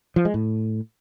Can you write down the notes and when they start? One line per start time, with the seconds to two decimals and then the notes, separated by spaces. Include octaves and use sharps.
0.16 F3
0.25 G#3
0.34 A2